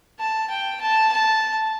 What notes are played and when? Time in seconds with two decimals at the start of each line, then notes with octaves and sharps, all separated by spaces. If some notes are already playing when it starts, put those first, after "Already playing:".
0.20 A5
0.50 G5
0.81 A5
1.12 A5